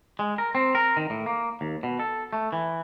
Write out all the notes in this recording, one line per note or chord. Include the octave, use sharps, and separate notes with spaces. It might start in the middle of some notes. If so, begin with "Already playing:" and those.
G#3
A#4
C4
A#4
D#3
A2
A#3
D#2
B2
A4
A3
E3